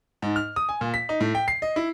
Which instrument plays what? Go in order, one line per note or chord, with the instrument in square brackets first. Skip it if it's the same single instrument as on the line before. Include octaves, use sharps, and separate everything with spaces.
[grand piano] G#2
F6
D#6
G#5
A#2
B6
D#4
A2
G5
C7
D#5
E4